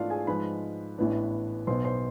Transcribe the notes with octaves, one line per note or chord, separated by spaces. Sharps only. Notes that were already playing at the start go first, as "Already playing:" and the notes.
Already playing: G#2 E3 A3 D4 F4 D5 F5
G#4 G#5
G#2 F3 G#3 B4 B5
A1 A2 E3 B3 D4
B1 B2 B3 C5 C6
C5 C6